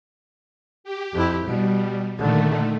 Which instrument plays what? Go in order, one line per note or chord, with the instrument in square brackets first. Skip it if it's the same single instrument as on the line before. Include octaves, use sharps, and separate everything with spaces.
[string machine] G4
[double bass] F2 E4
[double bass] B2 [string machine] G3
[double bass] A#2 D3 [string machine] D#3 A3